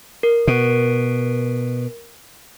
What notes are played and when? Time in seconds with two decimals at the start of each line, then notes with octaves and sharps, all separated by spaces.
0.23 A#4
0.47 B2